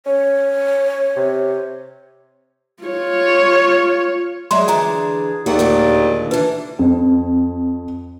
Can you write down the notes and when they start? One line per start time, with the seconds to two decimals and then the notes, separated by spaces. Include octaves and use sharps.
0.06 C#4 C#5
1.16 C3
2.84 F4 C#5
4.51 F#3 G#3 G#4 D5 E5 C6
4.68 D3 E3 D4 G#5 A#5
5.46 D#2 F#4 G#4 D5 F#5
5.59 D2 A#2 G#3
6.31 D3 E3 D4 B4
6.79 F2